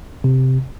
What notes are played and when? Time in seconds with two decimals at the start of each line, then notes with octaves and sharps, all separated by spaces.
0.24 C3